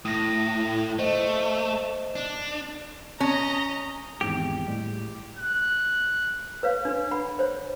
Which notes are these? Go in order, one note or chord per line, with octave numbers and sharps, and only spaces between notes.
A2 D#6 A#6
A3 C5 D#5
D4
C#4 D#5 A#5
G#1 E2 G#2 G4
A2 G3 G#3
F#6
B4 C#5 F5
D4 B4
F#5 B5
C5 C#5